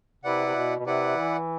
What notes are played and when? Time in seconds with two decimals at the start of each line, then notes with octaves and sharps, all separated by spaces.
0.24 C3 E4 B4 D5 F#5
0.46 C3
0.55 B2
0.79 B2
0.86 C3 E4 B4 D5 F#5
1.17 E3